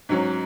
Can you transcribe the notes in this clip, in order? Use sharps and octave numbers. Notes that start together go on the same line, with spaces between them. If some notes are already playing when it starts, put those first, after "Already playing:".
G#2 F#3 C#4